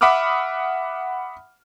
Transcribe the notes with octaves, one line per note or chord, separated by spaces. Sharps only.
E5 F#5 B5 D6 D#6 F6